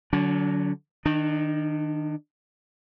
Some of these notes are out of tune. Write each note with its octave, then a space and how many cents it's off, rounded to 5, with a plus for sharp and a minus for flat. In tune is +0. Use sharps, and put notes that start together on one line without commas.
D3 +0 F#3 +0 D4 -45
D#3 +0 D4 +30